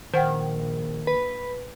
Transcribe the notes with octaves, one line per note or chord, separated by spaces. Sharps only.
A#1 D#3 C5 F#5 G5
B4